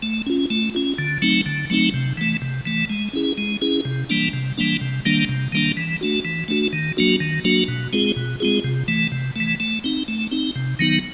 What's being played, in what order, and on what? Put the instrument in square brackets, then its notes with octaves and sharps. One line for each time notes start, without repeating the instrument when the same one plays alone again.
[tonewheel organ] A3
C#4 F4
A3
C#4 F4
D3
F#3 A3 C4 D#4
D3
F#3 A3 C4 D#4
C3
E3 A3
C3
E3 A3
G#3
C#4 E4 G#4
G#3
C#4 E4 G#4
C3
E3 G3 A#3 D4
C3
E3 G3 A#3 D4
C3
D#3 G3 A#3 D4
C3
D#3 G3 A#3 D4
E3
A3 D4 F#4
E3
A3 D4 F#4
D#3
F#3 A#3 D4 F#4
D#3
F#3 A#3 D4 F#4
B2
G#3 C4 F4 G#4
B2
G#3 C4 F4 G#4
C3
E3 A3
C3
E3 A3
A3
C4 D#4
A3
C4 D#4
C3
D#3 F#3 B3 D#4